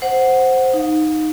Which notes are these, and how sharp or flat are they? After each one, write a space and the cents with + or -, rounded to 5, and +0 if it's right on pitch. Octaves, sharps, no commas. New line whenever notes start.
C5 +0 F#5 +0
D#4 +0 F5 +40